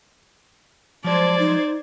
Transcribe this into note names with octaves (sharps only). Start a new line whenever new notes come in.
F3 F#3 G#3 C5 D5 A5 G#6 A6
D#4